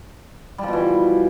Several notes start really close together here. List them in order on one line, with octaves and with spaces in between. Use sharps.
G3 F3 B2 E3